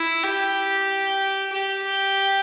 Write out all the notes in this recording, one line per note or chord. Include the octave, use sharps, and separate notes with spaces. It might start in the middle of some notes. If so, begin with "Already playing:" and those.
Already playing: E4
G4
G4